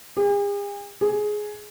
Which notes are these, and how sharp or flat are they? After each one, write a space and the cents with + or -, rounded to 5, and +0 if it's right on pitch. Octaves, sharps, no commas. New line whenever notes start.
G#4 -45
G#4 +10